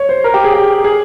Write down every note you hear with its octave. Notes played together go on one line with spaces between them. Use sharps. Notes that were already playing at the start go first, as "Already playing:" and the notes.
Already playing: C#5
C5
A#4
G4
G#4
G4
G#4